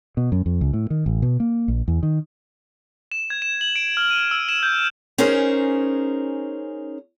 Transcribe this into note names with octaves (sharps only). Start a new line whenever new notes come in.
B2
F#2
F2
C#2
A2
D#3
A1
B2
A#3
A#1
E2
D#3
E7
G#6
E7
F#7
D7
F6
D#7
E6
E7
G6
C#4 D#4 G#4 A#4 C5